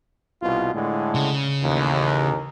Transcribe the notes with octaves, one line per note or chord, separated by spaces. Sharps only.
C2 B2 F4
A2 D3 G#3
C#3
A1 D#2